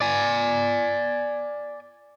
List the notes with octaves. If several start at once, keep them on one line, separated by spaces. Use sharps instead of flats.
D5 G#5